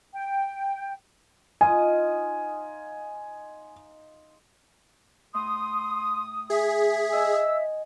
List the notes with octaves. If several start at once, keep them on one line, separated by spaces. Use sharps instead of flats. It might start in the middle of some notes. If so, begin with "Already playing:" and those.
G5
D#4 F4 D#5 G#5
A2 C6 D#6
G#4 E5
D#5 G#5 E6